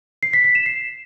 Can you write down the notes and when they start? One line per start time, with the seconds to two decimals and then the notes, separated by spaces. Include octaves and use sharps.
0.23 C7
0.33 B6
0.44 B6
0.55 E7
0.66 C7